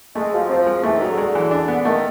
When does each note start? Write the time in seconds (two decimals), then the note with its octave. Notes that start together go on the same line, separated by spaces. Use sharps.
0.15 G#3 A3
0.33 F3 F#3
0.50 F3 C4
0.66 G#3
0.83 E3 A3
0.95 D#3
1.01 F#3
1.06 D3
1.17 G#3
1.35 E3
1.51 D4
1.68 B3
1.85 D#3 A3